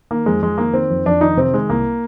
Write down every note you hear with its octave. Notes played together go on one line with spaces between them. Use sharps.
D#3 A#3
F2 G#3
F2 G#3
D#3 A#3
D#3 C4
F2
F2 D4
D#3 D#4
C3 C4
D#3 G#3
C2 A#3